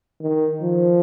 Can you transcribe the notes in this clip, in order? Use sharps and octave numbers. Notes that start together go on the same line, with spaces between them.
D#3
F3